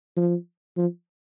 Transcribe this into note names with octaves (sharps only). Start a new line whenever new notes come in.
F3
F3